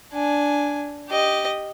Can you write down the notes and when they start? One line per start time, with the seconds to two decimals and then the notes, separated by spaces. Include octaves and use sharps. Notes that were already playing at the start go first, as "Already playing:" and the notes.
0.13 D4 G#5
1.10 G4 D#5